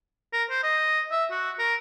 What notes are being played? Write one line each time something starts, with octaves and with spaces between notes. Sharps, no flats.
A#4
C5
D#5
E5
F#4
A#4